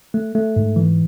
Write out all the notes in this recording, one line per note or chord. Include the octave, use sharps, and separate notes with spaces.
A3
A3
G#2
E3